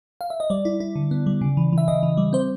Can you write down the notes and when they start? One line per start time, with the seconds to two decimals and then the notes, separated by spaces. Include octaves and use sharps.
0.21 F5
0.30 E5
0.40 D#5
0.50 G3 D5
0.65 E4
0.80 E4
0.96 D3
1.11 B3
1.26 G3
1.41 C#3
1.57 E3
1.73 E3
1.78 E5
1.88 C#3 D#5
2.03 E3
2.17 G3
2.33 C4 C5